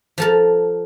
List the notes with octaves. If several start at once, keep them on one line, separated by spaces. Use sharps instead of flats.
F3 A4 A#4